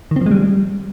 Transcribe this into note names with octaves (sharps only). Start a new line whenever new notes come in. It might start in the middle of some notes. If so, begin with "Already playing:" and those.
D#3
C4
F3
G#3
G3